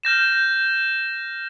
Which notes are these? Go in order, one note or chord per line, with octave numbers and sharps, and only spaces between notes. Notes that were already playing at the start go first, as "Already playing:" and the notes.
F6 G6 A#6 E7